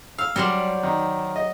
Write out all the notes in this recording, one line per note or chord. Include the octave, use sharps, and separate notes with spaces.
F5 E6
F#3 G3 C5 D5
D#3
D#5